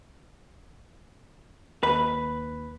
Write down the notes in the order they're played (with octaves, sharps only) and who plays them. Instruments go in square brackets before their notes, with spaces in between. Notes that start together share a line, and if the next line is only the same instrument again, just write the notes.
[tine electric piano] D#2 [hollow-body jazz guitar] B4